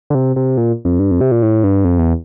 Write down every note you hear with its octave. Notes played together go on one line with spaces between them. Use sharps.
D3
C3
C3
A#2
F2
G2
F2
C3
A#2
A2
G2
F2
E2